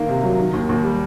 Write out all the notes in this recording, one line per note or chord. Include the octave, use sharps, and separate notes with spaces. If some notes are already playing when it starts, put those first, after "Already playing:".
Already playing: D#3 A#3
C3
F#3
D#3
D#2
D#2
G3